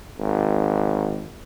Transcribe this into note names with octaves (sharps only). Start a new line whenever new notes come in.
G#1